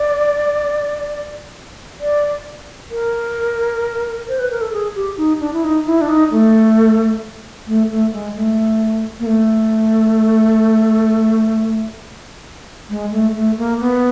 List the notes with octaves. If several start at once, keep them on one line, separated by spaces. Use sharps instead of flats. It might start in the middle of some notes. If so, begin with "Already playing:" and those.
Already playing: D5
D5
A#4
C5
B4
A#4
A4
G#4
G4
D#4
D4
E4
D#4
E4
D4
D#4
A3
A3
A3
G#3
A3
A#3
A3
G#3
A3
A3
A#3
B3